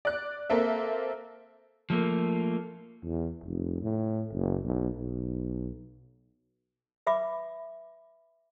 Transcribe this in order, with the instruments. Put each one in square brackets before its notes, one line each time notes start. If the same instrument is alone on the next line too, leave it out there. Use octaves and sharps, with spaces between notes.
[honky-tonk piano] D5 F#6
A#3 C4 A4 E5
[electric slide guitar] F3 A3 A#3
[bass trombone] E2
F1
A2
F#1
B1
B1
[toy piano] B4 E5 B5 D6